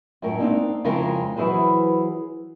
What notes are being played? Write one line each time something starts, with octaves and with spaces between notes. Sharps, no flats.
F#2 A2 A#4
A#3 C4 D4 D#4
F2 C#3 G#3 E4 A#4
E3 F#3 E4 G#4 B4 C5